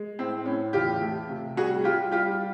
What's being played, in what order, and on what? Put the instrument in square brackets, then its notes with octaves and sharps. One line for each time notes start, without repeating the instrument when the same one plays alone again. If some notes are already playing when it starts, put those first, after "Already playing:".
Already playing: [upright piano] G#3
A2 C4
A2 C#4
E2 F4 G4
A3
C3
G3 F#4 G#4
G3 F4 G4
G3 F4 G4